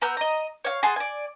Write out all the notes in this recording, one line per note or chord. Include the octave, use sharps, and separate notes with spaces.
B3 A#5 E6 G6
D#5 A#5
C#5 F5
G#4 F#5 A5 C6
D5 G#5